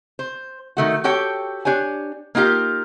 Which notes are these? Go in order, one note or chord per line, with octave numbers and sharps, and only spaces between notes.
C5
D#3 A3 F#4
F#4 G4 A4 C#5 G5
D4 G4 C#5 G#5
A#3 D#4 F4 G4 A#4